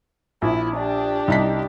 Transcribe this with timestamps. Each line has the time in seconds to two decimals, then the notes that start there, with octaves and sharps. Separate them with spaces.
0.42 A#1 E4
0.76 D4 G4
1.28 C2 D#4 B6